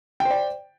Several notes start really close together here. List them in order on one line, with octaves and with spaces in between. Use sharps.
G5 C5 D5